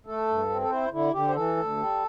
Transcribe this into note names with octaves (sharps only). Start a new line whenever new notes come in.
A3 A4
G2
C4
A4
E4 C5
D3 E4
D3 G4
C5
E3 A4
D2
G3